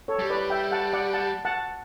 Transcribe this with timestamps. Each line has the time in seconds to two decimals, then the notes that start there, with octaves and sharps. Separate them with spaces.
0.08 A4 C#5
0.19 G3
0.30 B4 D5
0.50 E5 G5
0.72 F#5 A5
0.93 D5 F#5
1.13 F#5 A5
1.45 F#5 A5